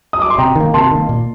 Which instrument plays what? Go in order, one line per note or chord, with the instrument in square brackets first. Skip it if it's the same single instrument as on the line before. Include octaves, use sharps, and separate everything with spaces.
[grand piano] D#6
D6
C6
[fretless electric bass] C3 [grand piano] G5 A#5
[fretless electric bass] D#3 A#3
[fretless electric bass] C3 [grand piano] A5 C6
[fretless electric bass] D#3 A#3
A#2